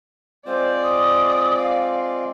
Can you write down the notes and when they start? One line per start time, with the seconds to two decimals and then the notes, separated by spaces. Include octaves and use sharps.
0.46 G#3 C4 F4 C5 D5
0.83 D#6
1.58 F5